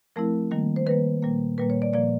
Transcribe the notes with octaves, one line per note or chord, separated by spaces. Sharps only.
F3 A3 C4 E4 A#4
D#3 G3 A#3
C5
D#3 G3 A#3 B4
A#2 G3 A#3
A#2 G3 A#3 B4
C#5
D5
A#2 F3 A#3 D5